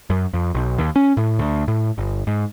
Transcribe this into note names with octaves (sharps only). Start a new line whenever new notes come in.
F#2
F2
B1
D#2
C#4
A2
D2
A2
G1
G#2